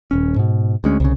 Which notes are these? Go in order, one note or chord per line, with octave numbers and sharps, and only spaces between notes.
D#1 C#4
G#2 B2
D2 G#3 C#4
C2 C#3